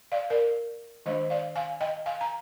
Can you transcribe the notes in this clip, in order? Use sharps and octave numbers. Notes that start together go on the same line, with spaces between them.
D5 F5
A#4 D5
D#3 G#3 D4 C5 D#5
D5 F5
F5 G#5
D#5 G5
F5 G#5
A#5